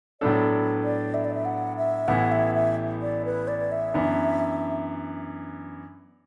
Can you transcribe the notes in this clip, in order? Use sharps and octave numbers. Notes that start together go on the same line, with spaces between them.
A2 F#3 B3 D4 A4 D5
D5
E5
D5
E5
F#5
E5
A1 A2 E3 B3 E4 F#5
E5
E5
D5
B4
D5
E5
F#2 E3 B3 D4